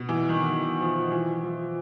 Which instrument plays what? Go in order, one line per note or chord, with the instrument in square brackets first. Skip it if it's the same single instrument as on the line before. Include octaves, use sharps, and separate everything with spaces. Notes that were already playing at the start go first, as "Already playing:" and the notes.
Already playing: [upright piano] B2
E3
D#3
E3
F3
E3
F3